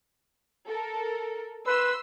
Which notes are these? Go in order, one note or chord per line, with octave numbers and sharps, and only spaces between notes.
A4 A#4
B4 C6 E6